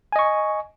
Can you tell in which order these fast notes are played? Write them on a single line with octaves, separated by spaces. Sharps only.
G#5 D#5 C#6